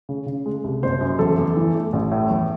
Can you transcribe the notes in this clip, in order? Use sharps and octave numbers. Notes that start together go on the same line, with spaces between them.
C#3
C#3
G#3
C2
F#1 C5
F#2
E2 A4
E2
E3
A3
A1
A2
E2